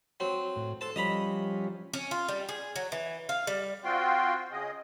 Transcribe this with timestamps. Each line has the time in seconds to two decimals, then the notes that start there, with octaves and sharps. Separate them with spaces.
0.20 F#3 C4
0.56 A2
0.81 A4 C5 A5
0.96 F3 G3 C#4 D#5 A#5 B5
1.94 C#4
2.11 F4
2.28 G3
2.49 G#4
2.76 F#3
2.92 E3
3.29 F5
3.47 G3
3.84 C4 F4 F#4 G5 C6
4.52 C#3 G#4 D#5